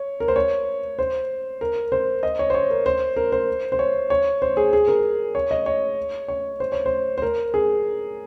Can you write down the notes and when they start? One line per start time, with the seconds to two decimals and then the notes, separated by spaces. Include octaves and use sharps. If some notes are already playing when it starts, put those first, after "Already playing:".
Already playing: C#5
0.20 A#4
0.28 C5
0.36 C#5
0.99 C5
1.61 A#4
1.92 C5
2.23 D#5
2.39 C#5
2.50 C5
2.54 C#5
2.70 A#4
2.86 C5
3.16 A#4
3.32 C5
3.72 C5
3.79 C#5
4.10 C#5
4.42 C5
4.57 G#4
4.73 G#4
4.88 A#4
5.35 C#5
5.51 D#5
5.66 C#5
6.28 C#5
6.60 C5
6.72 C#5
6.86 C5
7.18 C5
7.22 A#4
7.54 G#4